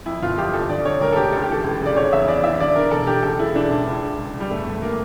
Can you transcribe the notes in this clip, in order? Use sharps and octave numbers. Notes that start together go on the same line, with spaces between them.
F2 E4
G1 F4
F2 G4
F2 A4
D3 D5
D3 C#5
D2 A#4
A4
D3 G4
C#2 A4
G4
E3 A4
C#2
C#3
D5
F1 C#5
E2 E5
E2 D5
E3 E5
D3 D5
D3 A#4
E1 A4
E1 G4
C#2 A4
C#3 E4
E3 D4
C#2 D4
C#2
C#2
C#2
C#2
G3
G1 A3
G1
A#3